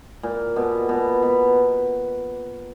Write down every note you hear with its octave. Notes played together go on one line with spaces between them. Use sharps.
A#2
B2
B2
B2